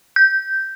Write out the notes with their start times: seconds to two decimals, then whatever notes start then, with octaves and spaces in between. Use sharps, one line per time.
0.16 G6